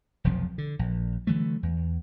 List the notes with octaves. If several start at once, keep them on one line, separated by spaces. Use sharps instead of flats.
F1 B1 F2 F3
D3
A#1
D3 E3 F#3 A3
E2